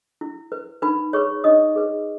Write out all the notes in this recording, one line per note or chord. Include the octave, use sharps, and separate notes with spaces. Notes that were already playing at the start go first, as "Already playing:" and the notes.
E4
B4
D#4 B4 B5
G#4 B4 C#5 C#6
D#4 D#5 D#6
G#4 B4